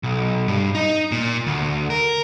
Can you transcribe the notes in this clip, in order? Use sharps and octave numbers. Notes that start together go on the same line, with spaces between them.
B1
G2
D#4
A#2
D2
A#4